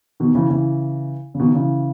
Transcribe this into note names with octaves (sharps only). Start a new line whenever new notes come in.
B2 D#3
C#3 E3
C#3 E3
C#3
B2 D#3
C#3 E3